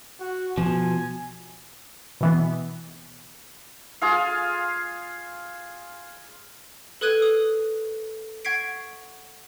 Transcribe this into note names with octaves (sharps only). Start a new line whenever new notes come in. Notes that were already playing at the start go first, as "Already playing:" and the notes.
F#4
B2 F3 G#5
B2 E3 B3
F4 G#4 F5
A4 B4 D#6 F#6 G#6 D#7
D#6
F#5 C#6 G#6 B6 C7 D7